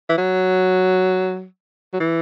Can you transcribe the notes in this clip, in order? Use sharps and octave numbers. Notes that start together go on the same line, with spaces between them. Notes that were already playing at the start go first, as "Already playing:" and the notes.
E3
F#3
F#3
E3